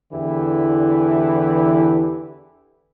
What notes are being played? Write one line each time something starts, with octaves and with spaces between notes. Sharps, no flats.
E2 D3 E3 E4 G4